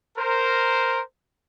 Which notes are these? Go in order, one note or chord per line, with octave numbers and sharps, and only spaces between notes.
A#4 C5